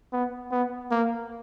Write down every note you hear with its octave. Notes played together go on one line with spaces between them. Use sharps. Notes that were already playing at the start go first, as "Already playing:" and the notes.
B3
B3
A#3